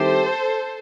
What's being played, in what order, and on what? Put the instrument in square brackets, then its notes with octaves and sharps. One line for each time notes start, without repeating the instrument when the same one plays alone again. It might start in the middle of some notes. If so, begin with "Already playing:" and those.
Already playing: [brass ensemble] D#3 G3 C4 E4 G4 [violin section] A4 C5